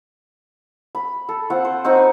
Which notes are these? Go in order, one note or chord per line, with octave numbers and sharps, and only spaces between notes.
B5
A4
C4 F4 F#5
C5
C4 D#4 F#5 C#6
B4